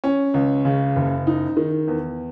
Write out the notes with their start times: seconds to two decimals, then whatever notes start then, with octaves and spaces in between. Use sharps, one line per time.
0.04 C#4
0.34 C#2
0.65 C#3
0.96 F#1
1.27 D#4
1.57 D#3
1.88 E2